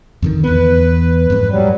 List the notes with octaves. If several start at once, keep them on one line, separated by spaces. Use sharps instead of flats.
F2 D3 D#3
E2 B3 B4
F2 G#2
F#3 G3